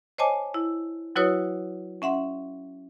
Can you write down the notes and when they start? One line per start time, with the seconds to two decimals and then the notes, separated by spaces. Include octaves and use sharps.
0.18 C5 C#5 D#5 G#5 A5 D6
0.54 E4
1.16 F#3 E4 F#4 B4 C#5 D#6
2.02 C#4 E5 F#5 C6